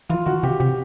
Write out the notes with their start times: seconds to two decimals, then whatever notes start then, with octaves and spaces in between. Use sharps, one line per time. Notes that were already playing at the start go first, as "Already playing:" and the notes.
0.09 E3 F4
0.26 D#3 F#4
0.43 C3 G4
0.60 C3 G4